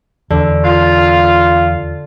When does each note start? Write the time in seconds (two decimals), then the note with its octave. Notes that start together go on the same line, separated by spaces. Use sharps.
0.30 E2 D3
0.64 F4